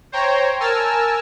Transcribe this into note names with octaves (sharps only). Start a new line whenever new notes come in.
C5 C#5 G5 A#5
A#4 G#5 A5 E6 F6